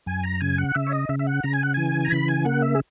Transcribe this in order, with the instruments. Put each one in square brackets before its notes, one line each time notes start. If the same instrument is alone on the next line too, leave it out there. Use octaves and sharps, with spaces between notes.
[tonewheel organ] F#2 G#5
A#5
C#3 G#5
F#5
C#3 E5
C#5
D#5
C#3 E5
E5
F#5
C#3 A#5
G#5
F#5
E3 G#5
A#5
C#3 B5
G#5
A#3 F#5
E5
G#4